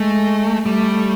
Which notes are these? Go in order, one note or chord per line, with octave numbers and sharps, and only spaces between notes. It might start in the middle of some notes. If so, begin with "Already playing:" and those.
Already playing: G#3 A3
G3 A3